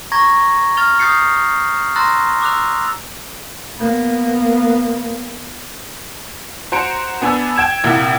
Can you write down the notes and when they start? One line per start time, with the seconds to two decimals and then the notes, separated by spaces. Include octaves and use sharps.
0.12 A#5 C#6 G#6 A#6
0.77 F6 A6 F7 G7
0.99 D#6 G6 A6 C7 C#7
1.96 A#5 C6 E6 F#6 A6 A#6
2.42 D6 E6 F#6 F7
3.77 A#3 B3
6.72 F#4 C5 A#5 C#7 D7
7.22 B3 D4 G#5 B5 E6
7.56 G5 G#6 E7
7.84 A#1 C3 A#3 E4 F#5